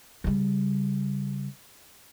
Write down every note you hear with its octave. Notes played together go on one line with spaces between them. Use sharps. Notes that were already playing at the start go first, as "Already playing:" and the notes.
C#3 G3